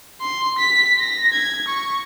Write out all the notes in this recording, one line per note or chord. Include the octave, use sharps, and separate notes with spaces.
C6
B6
A#6
G#6
C#6